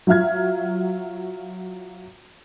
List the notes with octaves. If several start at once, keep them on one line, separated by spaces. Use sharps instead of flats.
F#3 F4 E5 F6 G#6